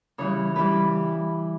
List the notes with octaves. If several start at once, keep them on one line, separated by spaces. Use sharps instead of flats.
C#3 E3 G3 C#5
C#3 E3 G3 B4